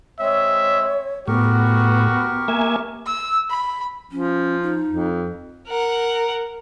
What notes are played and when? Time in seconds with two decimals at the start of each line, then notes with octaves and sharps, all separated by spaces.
0.20 G#3 C4 C#5 E5
1.28 A2 B3 F#4 G4 A#4 C#6
2.48 A#3 E5 G#5
3.06 E6
3.50 B5
4.11 F3 C#4
4.62 D#4
4.88 F2
5.68 A#4 F#5